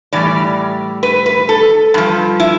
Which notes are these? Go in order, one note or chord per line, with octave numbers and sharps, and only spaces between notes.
A2 E3 G3 D5
B4
B4
A4
G2 F3
E4